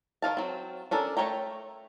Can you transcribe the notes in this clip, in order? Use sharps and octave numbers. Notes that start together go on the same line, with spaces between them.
D#3 D#4 F5 A5
F#3 C4
C#4 D4 A4 A#4
A3 B4 C#5 G5 A#5